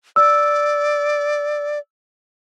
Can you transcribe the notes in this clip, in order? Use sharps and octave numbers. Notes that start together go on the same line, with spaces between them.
D5 E6